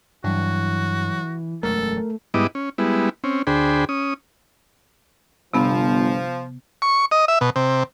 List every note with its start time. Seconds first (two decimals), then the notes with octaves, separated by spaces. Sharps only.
0.24 G2 E3 F#3 F#4
1.63 E1 F#2 G#3 A3 A4 A#4
2.34 G#2 G3 B3 E4 D#5 D6
2.55 C#4
2.78 G3 G#3 B3 E4
3.24 C4 C#4
3.47 D2 D4 G#4 C5 G5 B5
3.89 C#4 D#6
5.54 G1 C3 F3 B3
6.82 C#6
7.11 D#5
7.28 E5
7.41 B2
7.56 C3